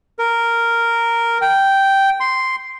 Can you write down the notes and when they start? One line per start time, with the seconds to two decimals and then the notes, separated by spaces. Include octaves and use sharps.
0.19 A#4
1.41 G5
2.20 C6